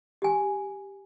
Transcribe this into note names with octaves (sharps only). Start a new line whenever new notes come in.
G4 G#5